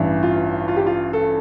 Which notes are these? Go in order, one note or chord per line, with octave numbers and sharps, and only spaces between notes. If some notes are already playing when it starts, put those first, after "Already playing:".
Already playing: A1 G2 E3
F4
F4
G4
F4
A4